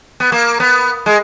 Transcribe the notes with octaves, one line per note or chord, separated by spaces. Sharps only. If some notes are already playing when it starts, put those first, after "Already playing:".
B3
A#3
B3
G#3